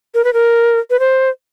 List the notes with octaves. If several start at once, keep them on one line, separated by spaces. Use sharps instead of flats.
A#4
B4
A#4
B4
C5